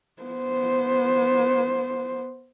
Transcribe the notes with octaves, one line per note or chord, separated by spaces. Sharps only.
B3 C5